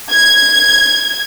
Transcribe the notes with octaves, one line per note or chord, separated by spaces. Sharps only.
G#6